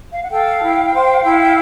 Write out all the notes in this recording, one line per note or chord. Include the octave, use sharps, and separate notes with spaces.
F5
F#5
A4 F5 G5
E4
C5
E4